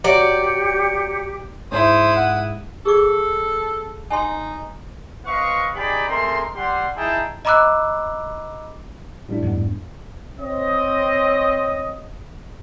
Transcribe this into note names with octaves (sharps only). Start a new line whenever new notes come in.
F#3 G4 D5 C#7
G#2 E4 C5 D#6
F#5
G#4 A4 D6
D#4 G#5 C6
C4 B4 D#5 F5 C#6
D#4 G4 G#4 D5 G5 B5
G#3 A3 C4 A#4 C6
G3 G4 F#5 C6
D#4 E4 G#4 G5 A5
D#5 A#5 B5 D6 E6 F#6
A2 G3 D4
F2 G#2 B3
C4 C#5 D#5